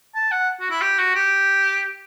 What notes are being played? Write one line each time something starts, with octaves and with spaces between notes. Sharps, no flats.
A5
F#5
F#4
E4
G4
F#4
G4